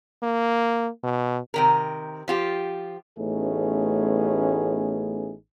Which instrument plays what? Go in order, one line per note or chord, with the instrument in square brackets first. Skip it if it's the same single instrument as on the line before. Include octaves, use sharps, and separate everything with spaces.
[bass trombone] A#3
B2
[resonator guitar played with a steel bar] C3 D#3 A#4
F3 F4 G4
[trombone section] A1 A3 B3 C#4 D#4 G#4